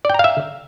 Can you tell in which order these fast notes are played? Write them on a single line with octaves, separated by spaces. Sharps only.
D5 G5 A#5 F5 E5